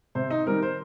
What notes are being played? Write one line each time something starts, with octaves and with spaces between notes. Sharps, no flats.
C3 C5
D#4 D#5
D#3 G3 C4 D#4 A#4
C5